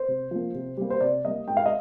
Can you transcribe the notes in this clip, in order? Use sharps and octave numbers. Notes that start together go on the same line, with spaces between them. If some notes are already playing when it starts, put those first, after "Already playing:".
Already playing: C5
C3
F3 A#3
C3
G3 A#3
C5
C3 D5
G3 A#3 D#5
G#2 G5
F5
D#5